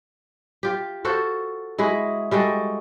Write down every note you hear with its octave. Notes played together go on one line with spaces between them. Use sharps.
F4 G4
F4 F#4 A4 C5
G#3 E4 F#4 G#4
G3 G#3 F#4 A4